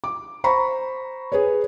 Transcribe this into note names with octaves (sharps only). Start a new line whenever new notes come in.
D6
C5 A#5 B5 C#6
G#4 B4 C#5